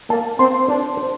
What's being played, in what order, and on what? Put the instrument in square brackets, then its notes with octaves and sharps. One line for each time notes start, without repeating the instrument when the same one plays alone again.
[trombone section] A#3 [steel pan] A5
[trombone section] C4 [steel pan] C6
[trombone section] D4 [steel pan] C5
[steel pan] C5